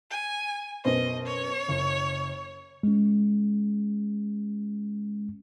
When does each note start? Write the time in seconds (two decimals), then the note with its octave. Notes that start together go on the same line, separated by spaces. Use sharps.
0.11 G#5
0.85 F#2 B2 C5 D#5
1.26 C#5
1.68 F#1
2.83 G#3 C#4